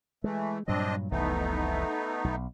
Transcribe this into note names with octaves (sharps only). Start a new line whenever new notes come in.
E3 G#3 A3
G2 A#2 F#3 C4 D4 D#5
F1 C2 E3 A3 B3 D#4
B1